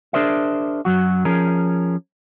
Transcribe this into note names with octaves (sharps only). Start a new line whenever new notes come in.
D4 G#4 A#4 C5 D5 E5
F#2 F#3 F#4
F3 C#4 G#4 A#4